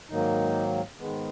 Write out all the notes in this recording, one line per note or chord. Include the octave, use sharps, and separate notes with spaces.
G#2 D#3 F#3 A#3 D#4
G#2 D#3 G#3 B3